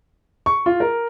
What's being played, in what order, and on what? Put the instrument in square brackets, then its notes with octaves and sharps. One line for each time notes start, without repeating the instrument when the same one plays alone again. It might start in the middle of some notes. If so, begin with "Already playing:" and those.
[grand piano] C#6
F4
A#4